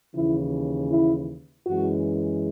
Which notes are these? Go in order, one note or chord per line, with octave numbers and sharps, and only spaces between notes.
D#2 C#3 E3 E4
E4
F#2 E3 G#3 F#4